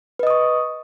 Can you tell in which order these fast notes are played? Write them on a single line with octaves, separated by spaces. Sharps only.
B4 D#5 D#6 C#6